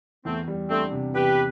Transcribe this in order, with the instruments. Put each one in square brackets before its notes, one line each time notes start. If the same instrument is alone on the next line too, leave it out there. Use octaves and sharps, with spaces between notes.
[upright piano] E2 [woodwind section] A3 C4
[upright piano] G3
[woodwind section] A3 C4 [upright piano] D4
[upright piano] C3
[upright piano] E2 [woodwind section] G4 B4